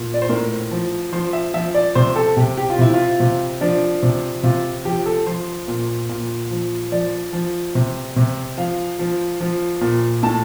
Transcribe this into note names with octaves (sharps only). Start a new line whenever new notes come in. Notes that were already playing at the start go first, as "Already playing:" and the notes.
Already playing: A#2
D5
C5
A2 A#4
F3
F3 C5
E5
F3 E5
D5
C3 C5
A4
C3 G4
G4
F4
C3 E4
F4
C3
F3 D4
C3
C3 F4
F3 G4
A4
F3 C5
A#2
A#2
F3
F3 D5
F3
C3
C3
F3 F5
F3
F3
A#2
A2 A5